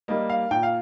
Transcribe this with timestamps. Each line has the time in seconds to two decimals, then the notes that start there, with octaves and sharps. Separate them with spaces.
0.08 G3 A#3 D#5
0.30 F5
0.51 A#2 G5
0.63 F5